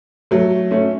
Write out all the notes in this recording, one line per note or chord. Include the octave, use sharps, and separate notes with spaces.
F#3 A3
A3 C#4